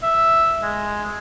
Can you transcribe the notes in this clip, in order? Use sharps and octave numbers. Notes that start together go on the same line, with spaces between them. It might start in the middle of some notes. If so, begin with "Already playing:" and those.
E5
G#3